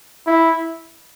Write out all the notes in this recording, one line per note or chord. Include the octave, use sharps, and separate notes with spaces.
E4